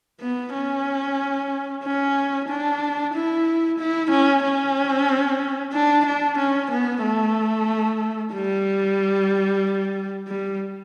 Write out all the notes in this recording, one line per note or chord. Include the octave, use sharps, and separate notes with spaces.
B3
C#4
C#4
D4
E4
E4
C#4
C#4
D4
D4
C#4
B3
A3
G3
G3